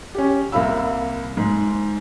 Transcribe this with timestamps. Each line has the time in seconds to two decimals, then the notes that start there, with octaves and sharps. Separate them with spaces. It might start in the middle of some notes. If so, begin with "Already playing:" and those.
0.15 C#4 G4
0.52 C2 A#3 F5 B5 E6
1.37 G#2